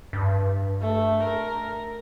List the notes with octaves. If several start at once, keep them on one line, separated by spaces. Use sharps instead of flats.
G2
A3
A#4